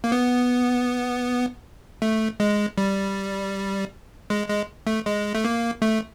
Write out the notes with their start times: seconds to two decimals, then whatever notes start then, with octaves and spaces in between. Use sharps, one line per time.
0.04 A#3
0.12 B3
2.02 A3
2.40 G#3
2.78 G3
4.30 G#3
4.48 G#3
4.87 A3
5.06 G#3
5.35 A3
5.45 A#3
5.82 A3